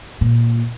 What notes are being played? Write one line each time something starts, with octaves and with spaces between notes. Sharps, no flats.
A#2